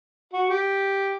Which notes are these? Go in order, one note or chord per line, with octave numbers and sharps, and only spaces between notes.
F#4
G4